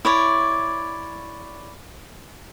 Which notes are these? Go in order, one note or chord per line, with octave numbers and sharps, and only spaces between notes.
E4 C#5 D5